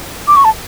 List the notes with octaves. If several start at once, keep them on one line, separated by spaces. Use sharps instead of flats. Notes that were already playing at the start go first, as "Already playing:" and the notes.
D6
C#6
A5